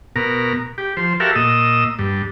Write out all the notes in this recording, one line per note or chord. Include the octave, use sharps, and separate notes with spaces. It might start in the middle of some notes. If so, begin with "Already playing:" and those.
B2 A#4
G4
F3 C5
F#4 G4 A4 A#4 E5 F5
A#2 D#5 E6
G2